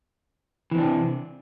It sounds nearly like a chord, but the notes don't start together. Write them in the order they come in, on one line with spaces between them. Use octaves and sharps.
E3 C4 D4 C3